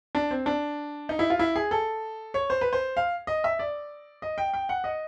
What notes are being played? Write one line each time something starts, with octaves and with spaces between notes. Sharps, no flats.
D4
C4
D4
D#4
E4
F4
E4
G#4
A4
C#5
C5
B4
C5
F5
D#5
E5
D5
D#5
G5
G5
F#5
D#5